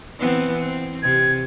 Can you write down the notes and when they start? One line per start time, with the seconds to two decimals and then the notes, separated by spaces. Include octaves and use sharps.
0.19 E3 B3 C4
0.59 C4
1.03 C3 G#6